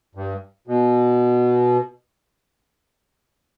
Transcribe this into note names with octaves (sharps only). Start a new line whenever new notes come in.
G2
B2